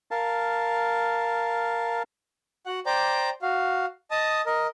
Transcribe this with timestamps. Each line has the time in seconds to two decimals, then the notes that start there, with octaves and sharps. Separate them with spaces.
0.11 A#4 F5 A5
2.65 F#4 F#5
2.86 C5 D5 G5 A#5 D6
3.42 F#4 F5
4.11 D#5 A5 D#6
4.46 A#4 D#5